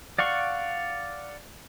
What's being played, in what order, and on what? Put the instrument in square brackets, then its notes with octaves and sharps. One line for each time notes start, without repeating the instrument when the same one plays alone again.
[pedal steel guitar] D5 F5 F#5 C#6